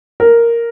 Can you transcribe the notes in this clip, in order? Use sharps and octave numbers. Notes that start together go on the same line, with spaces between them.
A#4